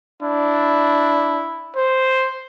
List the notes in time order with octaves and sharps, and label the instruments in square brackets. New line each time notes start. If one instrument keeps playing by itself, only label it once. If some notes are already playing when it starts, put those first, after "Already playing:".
[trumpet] D4 [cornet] E4
[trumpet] C5